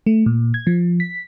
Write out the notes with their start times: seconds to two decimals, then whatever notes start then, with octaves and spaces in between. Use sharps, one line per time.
0.06 A3
0.26 A#2
0.54 G#6
0.67 F3
1.00 B6